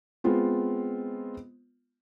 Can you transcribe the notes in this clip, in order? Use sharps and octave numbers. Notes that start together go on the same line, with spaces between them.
G#3 B3 C4 F4